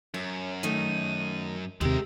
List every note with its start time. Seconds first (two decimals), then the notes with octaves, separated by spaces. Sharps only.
0.14 F#2 C#5
0.63 D#3 A3 D#4 D#7
1.81 D#2 C3 G#3 G4 A#4 E6